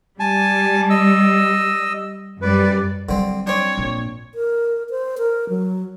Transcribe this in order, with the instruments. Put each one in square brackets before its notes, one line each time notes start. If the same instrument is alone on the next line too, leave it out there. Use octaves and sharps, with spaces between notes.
[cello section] G3 [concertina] G#5 A5
[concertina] D#5 E6
[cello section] F#2 G3 D5 [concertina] B4
[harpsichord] D3 C4 [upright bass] F#3 G3
[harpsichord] C4 D4 [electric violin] C#5
[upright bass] A#1 A#2
[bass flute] A#4
C5
A#4
F#3